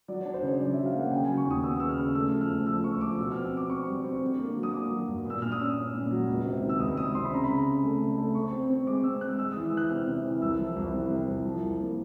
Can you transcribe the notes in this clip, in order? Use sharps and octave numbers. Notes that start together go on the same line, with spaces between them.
F#3 D5
C#5
D4
C5
C#3 C#5
F#3 D5
E5
F#3
F5
A#3 F#5
C#3 G5
G#5
F#3
C#6
D#2 D#6
B3 E6
D#6
C#3 E6
F6
C#3
A3 E6
F3
F6
D2
F3 E6
D2 C#6
F3 D6
B2 E6
C4 F6
C4 D6
C4 C#6
G3
C4
D3
A#3
F#3
D#6
A#3 D6
F#3
G2
A#2 E6
A#2 F6
D#6
C#4 E6
C#4
A#2
F#3
C#2
C3
D#3
E6
C#2 D#6
C#2 D#6
C3 C6
B5
C#3 A#5
B5
C#3
C#3
A3
C#3
A3
C4 C#6
C4
C4
G#3 D6
C4 E6
G#3 F#6
G#3 E6
D#6
E3
E6
E3 F#6
C3 F6
C3
E3
C2 E6
F3
C2
C3
C3
C2
F3
C2
A#3